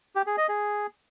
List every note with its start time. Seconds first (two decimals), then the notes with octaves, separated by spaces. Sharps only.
0.15 G4
0.27 G#4
0.38 D#5
0.49 G#4